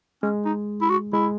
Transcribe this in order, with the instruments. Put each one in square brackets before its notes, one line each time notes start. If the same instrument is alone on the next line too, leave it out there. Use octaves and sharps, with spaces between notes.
[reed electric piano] G#3 [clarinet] C#4
[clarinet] D#4
E4
F#4
[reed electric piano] G#3 [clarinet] E4